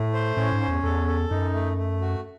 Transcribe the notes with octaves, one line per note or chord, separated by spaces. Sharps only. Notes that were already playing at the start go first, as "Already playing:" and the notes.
Already playing: A2 A3
C5
A2 C#4
G#2
C#4
E2
E2 A4
A4
F#2 D#4
A3
A3
F#4